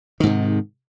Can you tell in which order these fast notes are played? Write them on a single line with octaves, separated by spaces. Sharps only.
D#3 G#2 C3